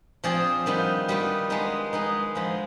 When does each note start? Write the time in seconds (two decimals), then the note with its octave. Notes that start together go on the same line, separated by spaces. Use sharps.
0.24 F3 C4 F4 G#4 D5
0.66 D#3 G3 B3 F4
1.08 D#3 G3 B3 F4
1.50 G#3 B3 D#4
1.93 G#3 B3 D#4
2.35 F3 G#3 B3 F4